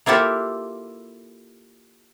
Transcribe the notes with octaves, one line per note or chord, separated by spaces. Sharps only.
A#3 E4 F4 G4 A4